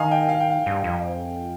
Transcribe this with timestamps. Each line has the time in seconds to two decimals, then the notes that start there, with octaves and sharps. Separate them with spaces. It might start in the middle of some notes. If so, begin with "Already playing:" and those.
Already playing: D#3 D#5 F5 G#5
0.11 G5
0.29 F5
0.40 G5
0.50 F5
0.66 G2
0.84 F2